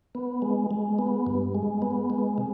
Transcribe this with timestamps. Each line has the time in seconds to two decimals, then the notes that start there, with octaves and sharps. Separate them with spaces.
0.15 B3
0.42 G#3
0.71 G#3
0.99 B3
1.27 G2
1.55 G#3
1.82 B3
2.10 G#3
2.38 C3